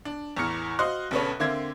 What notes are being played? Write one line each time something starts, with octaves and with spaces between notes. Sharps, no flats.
D4
E2 A2 E3 A#5 F6 C#7
F#4 C5 D#5 F5 C6 F#6
A#1 C#3 B3 A4 B4 C#5
D3 A#3 C4 E5 G#6